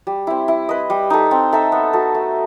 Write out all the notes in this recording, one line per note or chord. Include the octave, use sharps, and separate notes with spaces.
G3
C4 E4
E4
B4 D#5
G3
D#4 A4
C4
D#4 A4 E5
B3
F#4 A4
A3